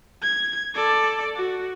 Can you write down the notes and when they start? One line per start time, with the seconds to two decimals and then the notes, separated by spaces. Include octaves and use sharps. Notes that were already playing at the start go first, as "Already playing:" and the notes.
0.22 G#6
0.74 A4 D5
1.36 F#4